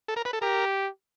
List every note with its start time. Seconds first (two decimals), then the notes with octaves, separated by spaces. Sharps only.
0.08 A4
0.16 A#4
0.25 B4
0.33 A4
0.42 G4 A#4